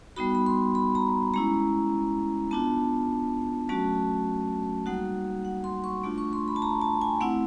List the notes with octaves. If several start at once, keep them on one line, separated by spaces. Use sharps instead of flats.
G3 B3 D#4 F#4 B5
B5
C6
B5
A#5
G#3 C#4 E4 A#5
B3 D4 F4 A5
F#3 A3 C#4 F#4 A5
G3 A#3 D#4 F#4 F#5
F#5
C6
C#6
A3 D4 F4
C#6
C6
B5
A5
A#5
A5
G#5
A3 C4 E4 F#5